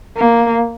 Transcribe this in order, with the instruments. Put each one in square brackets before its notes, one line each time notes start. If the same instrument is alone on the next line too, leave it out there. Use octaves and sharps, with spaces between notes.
[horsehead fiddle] A#3